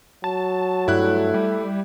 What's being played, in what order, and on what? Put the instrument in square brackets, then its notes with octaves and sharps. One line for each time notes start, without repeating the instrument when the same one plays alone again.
[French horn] F#3 [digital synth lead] A5
[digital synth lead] G2 [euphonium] A3 [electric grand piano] E4 F#6
[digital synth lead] G3